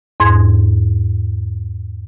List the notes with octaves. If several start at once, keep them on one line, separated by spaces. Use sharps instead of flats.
E2 G#2 C6 G#6